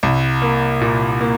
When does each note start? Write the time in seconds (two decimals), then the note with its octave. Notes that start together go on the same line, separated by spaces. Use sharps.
0.03 C2
0.42 A#3
0.81 A#2
1.21 A#3